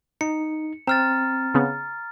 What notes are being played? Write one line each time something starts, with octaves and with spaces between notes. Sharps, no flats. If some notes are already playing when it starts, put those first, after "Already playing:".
D#4 C#7
C4 A#5 F6 A6
C#3 B3